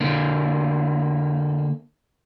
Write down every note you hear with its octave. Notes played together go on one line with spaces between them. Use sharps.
D3 A#3